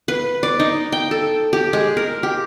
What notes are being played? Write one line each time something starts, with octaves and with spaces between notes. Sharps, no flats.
B4
D5
D#4
G5
A4
G4
G#3
A#4
G4